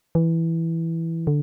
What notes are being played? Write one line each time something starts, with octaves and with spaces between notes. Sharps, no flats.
E3
D3